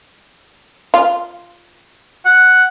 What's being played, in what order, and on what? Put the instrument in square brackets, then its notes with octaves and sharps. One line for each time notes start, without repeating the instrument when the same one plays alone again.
[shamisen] F4
[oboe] F#5